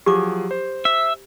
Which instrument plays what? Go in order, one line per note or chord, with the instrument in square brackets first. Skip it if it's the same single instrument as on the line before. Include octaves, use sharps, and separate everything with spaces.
[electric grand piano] F3 F#3 G#4 [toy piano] G4 D6
[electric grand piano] C5
[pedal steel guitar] E5